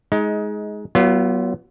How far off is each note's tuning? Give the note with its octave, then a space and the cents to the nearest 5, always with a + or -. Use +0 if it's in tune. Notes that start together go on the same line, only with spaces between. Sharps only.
G#3 +15 D#4 +25
F#3 +35 B3 -20 F4 -15